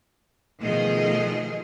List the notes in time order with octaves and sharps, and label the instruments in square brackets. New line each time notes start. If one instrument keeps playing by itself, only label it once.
[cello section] B2 D#3 F3 A3 G#4 D#5